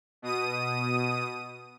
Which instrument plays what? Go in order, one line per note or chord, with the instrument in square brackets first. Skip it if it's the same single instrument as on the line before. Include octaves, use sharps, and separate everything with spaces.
[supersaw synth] B2 D#6 D#7